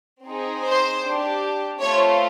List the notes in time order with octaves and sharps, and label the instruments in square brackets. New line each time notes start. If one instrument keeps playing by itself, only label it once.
[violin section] C4 D#4 G#4
C5
D4 G4
A3 C4 F4 C#5